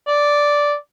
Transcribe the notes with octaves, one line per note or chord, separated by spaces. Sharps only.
D5